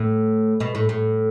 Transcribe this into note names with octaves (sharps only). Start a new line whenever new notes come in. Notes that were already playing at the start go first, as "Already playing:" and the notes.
Already playing: A2
B2
A2
A2